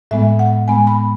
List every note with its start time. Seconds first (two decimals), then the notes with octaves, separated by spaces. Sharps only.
0.11 A2 G#3 B3 E5
0.39 F#5
0.68 A2 G#3 B3 G#5
0.87 B5